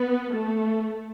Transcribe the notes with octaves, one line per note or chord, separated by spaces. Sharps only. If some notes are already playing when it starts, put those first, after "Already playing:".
Already playing: B3
A3